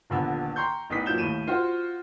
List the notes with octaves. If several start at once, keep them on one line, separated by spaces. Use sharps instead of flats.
D#1 A#1 D3 B3 E6
G5 A#5 C6 C#6 G6
A1 E2 D#4 B4 D#6 B6
A#2 F#3 G6 E7 G7
D#2 A2 D#7 E7
F4 F#4 C5